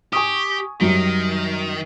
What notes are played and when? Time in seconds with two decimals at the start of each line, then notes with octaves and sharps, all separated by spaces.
0.13 G4 G#5 C#6 D#6
0.81 F#2 D#3 F#3 G3